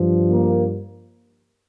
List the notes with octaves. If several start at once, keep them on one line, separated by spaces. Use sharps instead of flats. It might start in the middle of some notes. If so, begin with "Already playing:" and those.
Already playing: G2 F3
A#3